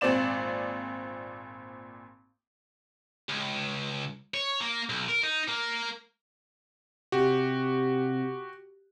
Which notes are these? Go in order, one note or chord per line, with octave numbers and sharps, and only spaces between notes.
G#1 A#2 C4 D5 E7
C#2
C#5
A#3
B1
A#4
D#4
A#3
C3 F#4 G4